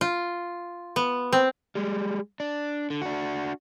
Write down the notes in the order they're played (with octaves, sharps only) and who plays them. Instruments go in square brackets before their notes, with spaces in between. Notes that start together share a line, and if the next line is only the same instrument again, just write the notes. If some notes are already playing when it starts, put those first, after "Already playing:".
[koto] F4
B3
C4
[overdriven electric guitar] G3 G#3
D4
D3
D4 F#4